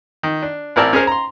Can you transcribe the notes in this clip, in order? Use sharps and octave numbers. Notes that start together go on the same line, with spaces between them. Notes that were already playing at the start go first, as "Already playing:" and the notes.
D#3
D4
A1 C4 E4 A#4 D5 A5
C#4 G#4 A#4 C5
A#5 C6